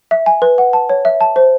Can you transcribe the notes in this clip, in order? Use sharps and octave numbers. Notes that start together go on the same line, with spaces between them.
E5
G#5
B4
F#5
A5
C#5
E5
A5
C5